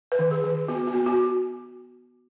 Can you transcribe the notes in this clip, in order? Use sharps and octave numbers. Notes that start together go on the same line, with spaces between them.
B4
D#3
G#4
D#3
B3 F#4
F#4
B3
F#4